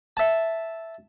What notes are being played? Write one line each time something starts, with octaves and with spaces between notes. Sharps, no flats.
E5 A5